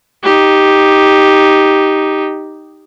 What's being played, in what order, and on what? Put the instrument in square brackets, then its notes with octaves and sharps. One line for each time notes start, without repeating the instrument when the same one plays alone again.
[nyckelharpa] D#4 G4